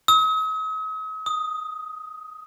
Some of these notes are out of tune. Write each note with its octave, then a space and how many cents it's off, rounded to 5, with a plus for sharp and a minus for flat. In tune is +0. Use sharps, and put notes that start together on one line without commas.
D#6 +45
D#6 +5